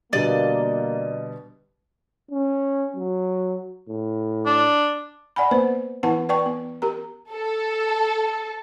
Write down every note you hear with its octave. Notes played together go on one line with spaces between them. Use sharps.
B2 D3 G3 A#3 D5 D#5
C#4
F#3
A2
D4
D5 F#5 G#5 B5
A#3 B3 B4 C5
E3 B3 E4 B4 F#5 A5
B4 D5 G5 A5 C#6
B3
G4 A#4 A#5
A4